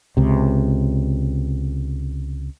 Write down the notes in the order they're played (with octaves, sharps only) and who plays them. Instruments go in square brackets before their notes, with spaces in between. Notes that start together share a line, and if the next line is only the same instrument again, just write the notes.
[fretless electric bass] C#2 C3